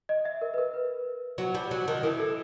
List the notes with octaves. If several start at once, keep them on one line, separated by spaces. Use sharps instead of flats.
D#5
E5
A#4
B4
A#4
B4
F#3
G3
F#3
D#3
E3 A#4
A4